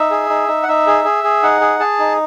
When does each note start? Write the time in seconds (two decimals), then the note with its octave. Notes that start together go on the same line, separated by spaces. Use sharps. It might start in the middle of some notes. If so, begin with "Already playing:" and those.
Already playing: D#4 E5
0.11 G#4
0.30 D#4
0.48 D#4
0.63 F#5
0.68 D#4 E5
0.87 G#4
1.04 G#4
1.24 G#4
1.43 D#4 F#5
1.61 G#4
1.80 G#4 A5
1.99 D#4